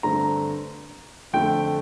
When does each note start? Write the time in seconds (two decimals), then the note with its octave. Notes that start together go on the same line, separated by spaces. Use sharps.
0.03 G2 D3 A3 C4 A#5
1.33 F2 D3 A3 G5